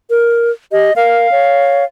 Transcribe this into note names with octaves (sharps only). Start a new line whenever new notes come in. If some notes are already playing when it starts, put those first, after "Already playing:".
A#4
G4 D#5
A#4 F5
C#5